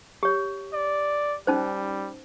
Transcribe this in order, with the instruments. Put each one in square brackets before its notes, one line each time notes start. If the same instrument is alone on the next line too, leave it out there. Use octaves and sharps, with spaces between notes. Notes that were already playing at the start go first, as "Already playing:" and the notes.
[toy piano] G4 C#5
[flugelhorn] D5
[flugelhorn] G3 [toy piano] C#4 D#4 C5